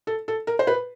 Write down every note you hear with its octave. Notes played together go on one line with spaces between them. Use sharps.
A4
A4
A#4
C5
B4